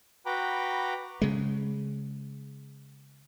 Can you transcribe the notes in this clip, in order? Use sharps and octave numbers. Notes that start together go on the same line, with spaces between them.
F#4 B4 G5 A#5 B5 D6
C#3 G#3